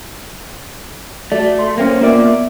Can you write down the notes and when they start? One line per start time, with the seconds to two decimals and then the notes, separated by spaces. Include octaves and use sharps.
1.32 A3 F#4 D5
1.59 C6
1.78 A#3 C4 C#4
2.01 A#3 B3 F4 A#4 D5 E5